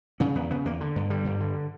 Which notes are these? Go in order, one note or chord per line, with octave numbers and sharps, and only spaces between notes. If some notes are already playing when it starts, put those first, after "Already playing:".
C#3 C#4
E2 B3
C#3 B3
E2 A#3
D3
G2
D3 G3
G2
D3